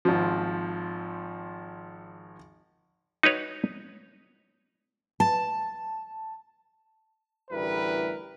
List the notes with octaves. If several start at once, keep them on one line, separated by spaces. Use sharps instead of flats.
G#1 F3
D#4 F#4 B4 C#5
A5
A1 D2 G3 E4 A#4 B4